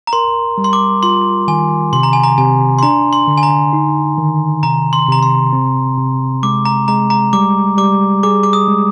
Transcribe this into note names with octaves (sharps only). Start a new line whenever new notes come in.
A#5
A#4 C6
G3
C6
D6
F4 C6
D#3 G#5
C3 C6
A#5
G#5
A#5
C3 G#5
C6
D4 A#5
C6
D3
G#5
A#5
D#4
D#3
C3 A#5
C6
C3 A#5
C6
C4
C3
G#3 D6
A#5
G#3 A#5
A#5
G3 D6
G3 D6
G#4 D6
D6
D#6
G#3